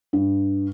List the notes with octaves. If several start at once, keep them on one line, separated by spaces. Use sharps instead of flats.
G2